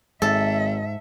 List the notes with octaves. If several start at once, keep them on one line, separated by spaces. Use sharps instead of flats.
G#1 G#2 A4 E5